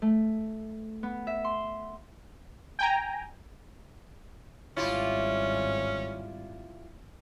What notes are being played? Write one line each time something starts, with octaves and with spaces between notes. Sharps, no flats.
A3
B3
E5
C6
G5 G#5 A#5
G#1 G3 C#4 E4 F4 G4